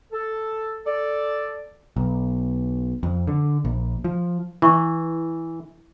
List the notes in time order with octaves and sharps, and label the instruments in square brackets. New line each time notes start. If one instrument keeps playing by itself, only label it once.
[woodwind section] A4
A4 D5
[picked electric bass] B1
F2
D3
A#1
F3
[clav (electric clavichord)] E3 [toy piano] E4 C#6